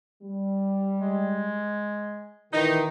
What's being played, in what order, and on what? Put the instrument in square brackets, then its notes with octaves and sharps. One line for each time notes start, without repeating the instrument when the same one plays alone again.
[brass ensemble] G3
[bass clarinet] G#3
[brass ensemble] D#2 A#2 E3 [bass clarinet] D#3 [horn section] D#4